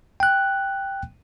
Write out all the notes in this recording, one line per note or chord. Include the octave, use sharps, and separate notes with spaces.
G5 F#6